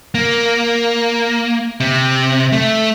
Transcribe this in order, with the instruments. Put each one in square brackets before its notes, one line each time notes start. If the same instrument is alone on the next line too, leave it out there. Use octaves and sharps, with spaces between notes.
[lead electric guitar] A#3
C3
A3